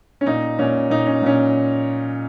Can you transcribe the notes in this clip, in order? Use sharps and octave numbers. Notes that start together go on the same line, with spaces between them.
C#4
A#2 D#4
A#2 C#4
A#2 D#4
C#4
A#2 C#4